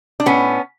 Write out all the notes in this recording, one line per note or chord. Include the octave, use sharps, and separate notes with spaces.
D4
A2 B3 C#4